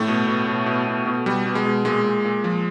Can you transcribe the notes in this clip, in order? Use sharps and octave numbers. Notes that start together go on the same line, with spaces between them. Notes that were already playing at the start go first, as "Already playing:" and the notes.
Already playing: A2 A3
B2
B2
B2
B2
B2
B2
B2 G3
B2
G#3
B2
A#2 G#3
A#2
A#2
F3